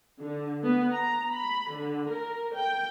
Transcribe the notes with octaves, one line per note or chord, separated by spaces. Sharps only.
D3
B3
A#5
B5
D3
A#4
G5